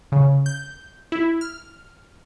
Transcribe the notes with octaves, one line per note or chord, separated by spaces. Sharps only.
C#3
G6
E4
F6